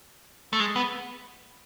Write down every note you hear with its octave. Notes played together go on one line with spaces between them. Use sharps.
A3
G#3
B3